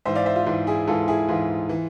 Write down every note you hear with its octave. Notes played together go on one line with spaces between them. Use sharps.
G#2 E3 C5 E5
D5 F5
C5 E5
F4
G#2 E3 F4
E4 G#4
G#2 E3 F4 A4
E4 G#4
G#2 E3 F4
E3